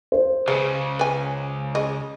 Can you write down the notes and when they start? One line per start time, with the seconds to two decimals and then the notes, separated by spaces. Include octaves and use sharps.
0.12 C5
0.48 C#2 C#3 G#3 B4
0.99 B4 G#5
1.75 G#4 D#5